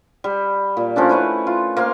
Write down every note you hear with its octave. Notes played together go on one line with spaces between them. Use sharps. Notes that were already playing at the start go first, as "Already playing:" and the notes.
G3
A#2
F3 A3 C#4 D4
E4 B4 C#5 F#5
F4
A#3 C5 F5